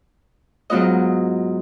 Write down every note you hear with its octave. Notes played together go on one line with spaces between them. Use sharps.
G#2 F#3 B3 F4 D#5